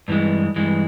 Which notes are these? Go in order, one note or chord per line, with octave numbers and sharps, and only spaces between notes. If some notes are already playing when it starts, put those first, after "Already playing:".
G2 E3 G#3
G2 E3 G#3